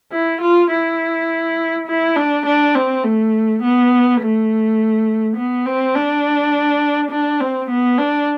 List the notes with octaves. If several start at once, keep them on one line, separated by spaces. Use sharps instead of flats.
E4
F4
E4
E4
D4
D4
C4
A3
B3
A3
B3
C4
D4
D4
C4
B3
D4